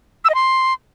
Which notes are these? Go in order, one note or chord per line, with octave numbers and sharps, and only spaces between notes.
E6
D#5
C6